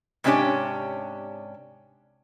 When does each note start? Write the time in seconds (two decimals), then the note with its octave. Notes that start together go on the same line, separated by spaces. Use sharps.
0.24 G#2 C3 C#4 D4 G4 C#5